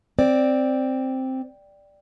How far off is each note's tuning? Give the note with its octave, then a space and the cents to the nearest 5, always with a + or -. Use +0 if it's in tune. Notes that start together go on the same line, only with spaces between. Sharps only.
C4 +0 D5 +0